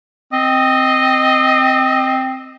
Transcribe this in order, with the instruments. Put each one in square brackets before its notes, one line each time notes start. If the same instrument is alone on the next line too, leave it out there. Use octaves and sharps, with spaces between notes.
[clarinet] C4 [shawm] D#5